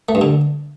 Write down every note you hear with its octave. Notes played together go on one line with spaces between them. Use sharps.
A3
G2
D3